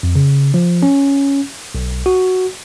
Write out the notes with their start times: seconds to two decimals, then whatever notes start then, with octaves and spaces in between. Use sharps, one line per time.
0.03 F2
0.16 C#3
0.54 F3
0.83 C#4
1.75 B1
2.06 F#4